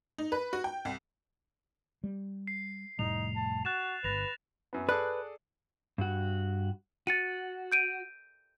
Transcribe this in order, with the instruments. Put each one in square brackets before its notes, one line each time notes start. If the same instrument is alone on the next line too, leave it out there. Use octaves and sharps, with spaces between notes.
[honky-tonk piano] D#4
B4
F#4
G5
C2
[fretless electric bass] G3
[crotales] C7
[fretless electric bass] F1 A2 G3 [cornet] D#4 [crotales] F7
[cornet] A5
[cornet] F#4 [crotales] F#6 A6 E7
[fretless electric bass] G1 [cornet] B4 [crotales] A6 A#6 F7
[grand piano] F#2 B3
[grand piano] G#4 A4 D5 [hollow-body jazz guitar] B4 [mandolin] F#6
[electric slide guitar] G2 F#4
[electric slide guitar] F#4 [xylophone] A6 C#7 D#7
[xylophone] G6 D7 D#7